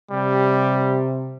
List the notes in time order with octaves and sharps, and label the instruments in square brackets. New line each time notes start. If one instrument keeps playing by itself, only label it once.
[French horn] C3 [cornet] G3